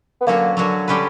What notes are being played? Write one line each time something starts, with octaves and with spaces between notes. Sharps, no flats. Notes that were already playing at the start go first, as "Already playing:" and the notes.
B3
D3 F#3 A#3 C#4 F#4
D3 F#3 C#4 F#4
D3 G3 C#4 G4 B4